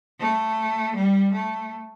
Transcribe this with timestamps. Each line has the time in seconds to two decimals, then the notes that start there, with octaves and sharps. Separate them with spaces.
0.19 A3
0.94 G3
1.32 A3